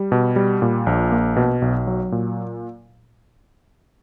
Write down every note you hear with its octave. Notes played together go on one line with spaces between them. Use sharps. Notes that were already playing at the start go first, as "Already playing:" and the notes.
Already playing: G3
B2
G3
A#2
A#1
A#3
B2
B1
F#3
A#2